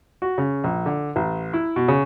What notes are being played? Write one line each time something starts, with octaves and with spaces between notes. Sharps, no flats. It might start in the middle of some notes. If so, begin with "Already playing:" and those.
F#4
C#3
A#1
D3
A1
E4
B2
C#3